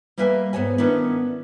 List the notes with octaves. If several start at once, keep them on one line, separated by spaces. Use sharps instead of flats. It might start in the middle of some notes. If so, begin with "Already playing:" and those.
G3 A#3 B4 E5 F5 G#5
G#2 B3 C5 C#5 G#5
D#3 B3 C#4 D4 E4